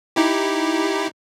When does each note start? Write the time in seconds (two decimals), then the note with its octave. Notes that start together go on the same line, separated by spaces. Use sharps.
0.16 D#4 E4 G4